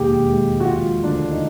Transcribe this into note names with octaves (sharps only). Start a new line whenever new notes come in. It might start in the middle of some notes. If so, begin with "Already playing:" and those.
Already playing: E1 D#2 D#3 G4 G#4
G#3
F#4
F3 F4
D2 D4
D#4